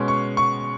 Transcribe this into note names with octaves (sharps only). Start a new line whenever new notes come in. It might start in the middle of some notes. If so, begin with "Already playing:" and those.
Already playing: B2 G#3 C#4
C#6
C#6